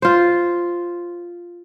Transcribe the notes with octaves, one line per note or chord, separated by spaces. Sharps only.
F4 C5